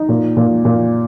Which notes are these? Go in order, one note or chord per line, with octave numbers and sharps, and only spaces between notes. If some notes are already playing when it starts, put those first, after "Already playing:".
Already playing: D#4
A#2
A#2
A#2